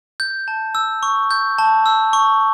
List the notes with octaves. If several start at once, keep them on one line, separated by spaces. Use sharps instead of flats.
G6
A5
E6
C#6
G6
A5
E6
C#6